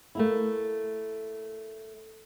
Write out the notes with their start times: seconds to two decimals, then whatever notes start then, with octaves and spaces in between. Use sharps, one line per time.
0.15 A3 A#3 E4